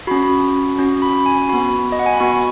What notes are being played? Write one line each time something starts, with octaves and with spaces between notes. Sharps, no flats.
C#4 F#4 B5
C#4 F#4
B5
G#5
B3 F#4 B5
D#5
F#5
G#5
B5
B3 F#4 C#6